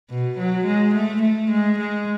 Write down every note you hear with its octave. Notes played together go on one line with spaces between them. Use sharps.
B2
F#3
G#3
A3
A3
G#3
G#3